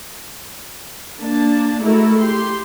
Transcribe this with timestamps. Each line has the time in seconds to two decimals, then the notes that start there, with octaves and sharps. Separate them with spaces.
1.21 A#3 D4 A5
1.81 G#3 A3 E4 F#4 A4 A#4
2.17 G4 C6